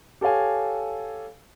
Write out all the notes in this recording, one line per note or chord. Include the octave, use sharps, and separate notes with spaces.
G4 A4 C#5 F5 G#5